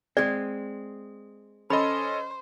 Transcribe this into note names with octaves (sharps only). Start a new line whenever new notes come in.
G#3 C4 D5
C#4 A4 C5 D#5 B5